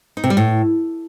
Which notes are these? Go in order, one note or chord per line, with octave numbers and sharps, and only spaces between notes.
D#4
C3
G3
A2